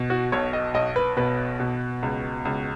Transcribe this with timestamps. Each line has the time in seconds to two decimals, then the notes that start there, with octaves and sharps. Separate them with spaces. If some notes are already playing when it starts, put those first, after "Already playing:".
Already playing: B2
0.10 F#4
0.32 B1 C#5
0.53 D#5
0.74 B1 D#5
0.96 B4
1.17 B2 B4
1.60 B2
2.03 C#2
2.45 C#2